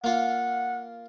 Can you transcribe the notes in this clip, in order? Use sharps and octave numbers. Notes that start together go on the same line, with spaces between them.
A#3 F4 F#5